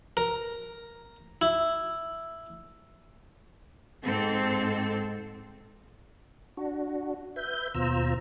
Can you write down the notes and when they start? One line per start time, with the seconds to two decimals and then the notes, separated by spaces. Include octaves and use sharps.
0.17 A#4
1.42 E4
4.04 G#2 C4 A4
6.57 D4 F#4
7.36 B4 E5 G6
7.75 D#2 B2 F4 C5 A#5 E6